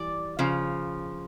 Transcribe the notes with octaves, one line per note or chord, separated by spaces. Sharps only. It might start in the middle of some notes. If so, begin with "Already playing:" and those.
Already playing: E3 G3 D5
C#3 F3